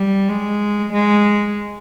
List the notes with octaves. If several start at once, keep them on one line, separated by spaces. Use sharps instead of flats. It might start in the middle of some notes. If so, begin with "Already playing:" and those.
Already playing: G3
G#3
G#3